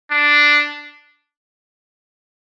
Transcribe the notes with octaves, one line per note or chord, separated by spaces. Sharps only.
D4